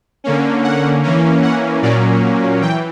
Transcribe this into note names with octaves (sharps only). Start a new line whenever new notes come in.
D3 A#3 C#4
F#5
E3 A#3 C#4
F#5
A#2 F#3 A#3 C#4 D5
E3 G5